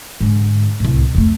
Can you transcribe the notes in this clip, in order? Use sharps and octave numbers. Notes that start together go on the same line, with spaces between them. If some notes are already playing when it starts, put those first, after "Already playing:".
G#2 D3
C2 A2
F2 A3